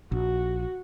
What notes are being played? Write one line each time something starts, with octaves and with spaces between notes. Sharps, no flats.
A#1 F#4